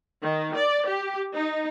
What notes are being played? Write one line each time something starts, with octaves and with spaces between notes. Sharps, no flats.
D#3
D5
G4
D#4